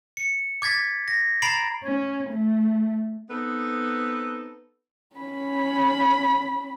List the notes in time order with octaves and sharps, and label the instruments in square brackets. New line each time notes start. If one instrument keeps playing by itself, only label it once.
[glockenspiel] C#7
D6 G#6 A6 B6
A#6
A#5 B5 A6 C7 D7 F#7
[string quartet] C#4
A3
[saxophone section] B3 C4 D#4 A4 B4
[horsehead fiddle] C#4 B5